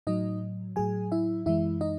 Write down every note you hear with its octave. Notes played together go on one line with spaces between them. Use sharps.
A2 F#3 D#4 D#5
A2 F#3 G#4 G#5
E4 E5
F#2 E3 G#3 E4 E5
D#4 D#5